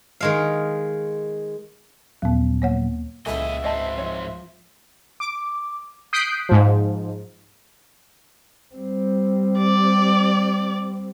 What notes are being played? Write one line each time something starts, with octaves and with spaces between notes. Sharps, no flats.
D#3 G#3 F5
D#2 A#2 F3 F#3 B3
A#3 C#5 F#5
C#2 A#2 C#3 E3 A4 D#5 E5
G#2 B3 C4 D#5 A5
F3 C#5
D6
D#6 F#6 G6 B6 C7 D7
G#2 F3
G3 C4
D5